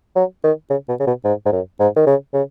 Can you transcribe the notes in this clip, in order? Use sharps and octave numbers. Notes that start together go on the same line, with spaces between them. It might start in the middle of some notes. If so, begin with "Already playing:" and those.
F#3
D#3
C#3
B2
C#3
B2
G#2
G#2
F#2
G#2
D#3
C#3
C#3